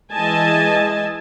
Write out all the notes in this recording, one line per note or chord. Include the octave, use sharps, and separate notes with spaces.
E3 G#3 D#5 G#5 A5